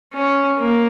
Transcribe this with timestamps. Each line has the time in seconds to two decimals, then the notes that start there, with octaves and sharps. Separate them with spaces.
0.13 C#4
0.59 A#3